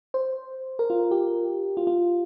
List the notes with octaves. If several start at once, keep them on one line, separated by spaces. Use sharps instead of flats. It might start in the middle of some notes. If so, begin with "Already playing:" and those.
C5
A#4
F4
G4
F4
F4